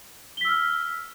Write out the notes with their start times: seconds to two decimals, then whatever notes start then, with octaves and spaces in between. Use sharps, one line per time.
0.37 G7
0.41 B6
0.45 E6
0.49 F6